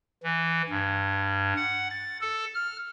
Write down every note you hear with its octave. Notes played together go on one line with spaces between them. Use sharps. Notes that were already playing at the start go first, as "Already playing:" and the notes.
E3
G2
F#5
A6
A4
F6